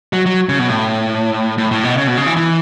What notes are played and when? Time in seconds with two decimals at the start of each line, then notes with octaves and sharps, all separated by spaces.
0.13 F#3
0.26 F#3
0.49 C#3
0.59 B2
0.69 A2
1.58 A2
1.71 A2
1.84 B2
1.97 C#3
2.07 B2
2.17 C#3
2.26 E3
2.36 E3